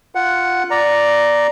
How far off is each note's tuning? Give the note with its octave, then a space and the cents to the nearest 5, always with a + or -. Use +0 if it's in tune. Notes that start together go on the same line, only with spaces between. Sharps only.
F4 +0 F#5 +0
D5 +0 A#5 +0